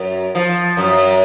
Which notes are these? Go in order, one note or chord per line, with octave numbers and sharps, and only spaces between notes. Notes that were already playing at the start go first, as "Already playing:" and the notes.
Already playing: F#2
F3
F#2